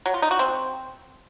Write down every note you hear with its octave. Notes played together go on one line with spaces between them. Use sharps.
F#3
F4
D#4
F#4
C4